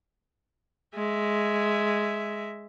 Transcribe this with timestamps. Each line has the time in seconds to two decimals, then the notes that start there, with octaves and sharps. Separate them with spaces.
0.94 G#3 E5